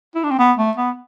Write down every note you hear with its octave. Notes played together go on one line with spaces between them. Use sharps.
E4
D4
C4
B3
A3
B3